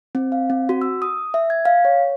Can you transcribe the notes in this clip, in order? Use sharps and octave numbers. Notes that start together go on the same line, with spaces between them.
C4
F5
C4
F#4
E6
D#6
E5
G#6
F5
C#5